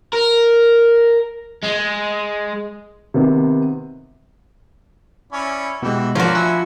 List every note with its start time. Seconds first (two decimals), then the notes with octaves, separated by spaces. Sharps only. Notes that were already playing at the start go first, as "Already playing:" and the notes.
0.13 A#4
1.64 G#3
3.14 C3 D#3 B3
5.32 C#4 E4 D5
5.83 B2 E3 G#3 F#4 G4
6.15 F3 A#3 F#4 A#4 C#5 D5
6.35 E4 E5 F#5 G#5